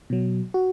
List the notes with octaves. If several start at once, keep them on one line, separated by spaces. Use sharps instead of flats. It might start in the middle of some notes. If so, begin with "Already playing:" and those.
B2 F#3
F#4